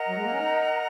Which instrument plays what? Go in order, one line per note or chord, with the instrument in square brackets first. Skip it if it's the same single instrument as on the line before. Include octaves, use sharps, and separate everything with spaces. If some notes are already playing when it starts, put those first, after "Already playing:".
Already playing: [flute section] A#4 D#5 F#5 A#5
[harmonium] F#3
G#3
A#3
C#4
D#4